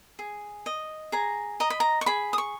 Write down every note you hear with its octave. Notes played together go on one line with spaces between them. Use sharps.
G#4
D#5
G#4 A#5
D#5 A#5
B5
A#5
C#6
G#4 B5
D#6
C#6